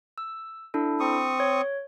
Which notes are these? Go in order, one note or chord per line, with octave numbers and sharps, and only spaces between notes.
E6
D4 E4 A4
C4 C#6 D#6
C#5